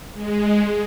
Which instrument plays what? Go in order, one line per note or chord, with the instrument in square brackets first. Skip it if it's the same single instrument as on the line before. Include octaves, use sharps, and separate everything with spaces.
[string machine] G#3